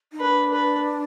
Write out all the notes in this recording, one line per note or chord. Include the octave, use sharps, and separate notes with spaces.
D#4
D4 B4
B4